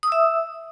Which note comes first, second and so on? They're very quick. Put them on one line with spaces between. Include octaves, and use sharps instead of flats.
D#6 E6 E5